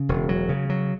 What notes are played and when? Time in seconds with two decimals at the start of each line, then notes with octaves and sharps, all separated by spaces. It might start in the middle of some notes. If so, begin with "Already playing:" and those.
Already playing: C#3
0.09 E1
0.29 F#3
0.49 C#3
0.70 F#3